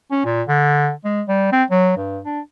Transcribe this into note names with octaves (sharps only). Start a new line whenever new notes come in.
C#4
A#2
D3
G#3
G3
C4
F#3
G2
D4